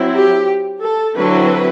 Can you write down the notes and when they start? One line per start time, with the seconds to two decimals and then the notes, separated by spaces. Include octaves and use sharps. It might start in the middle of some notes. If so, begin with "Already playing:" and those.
Already playing: F#3 C4 E4
0.13 G4
0.82 A4
1.17 D3 F#3 C4 E4 B4